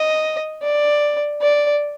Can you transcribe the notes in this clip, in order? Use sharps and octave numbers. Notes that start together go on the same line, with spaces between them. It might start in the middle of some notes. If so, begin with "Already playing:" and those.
Already playing: D#5
D5
D5